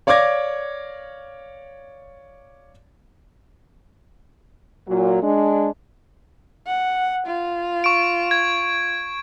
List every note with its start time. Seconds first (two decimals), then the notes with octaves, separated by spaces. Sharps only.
0.07 C#5 D5 F5 D6 G#6 A#6
4.88 A#2 F#3
5.22 G#3 D4
6.67 F#5
7.26 F4
7.84 C#6 D7
8.31 G#6